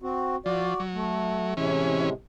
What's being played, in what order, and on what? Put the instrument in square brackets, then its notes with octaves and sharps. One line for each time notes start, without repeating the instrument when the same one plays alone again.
[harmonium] C4 F#4
[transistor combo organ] F3 [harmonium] F#4 D5
[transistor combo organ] F#3
[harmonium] A3
[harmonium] A2 C3 G#3 [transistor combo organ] E3 C#4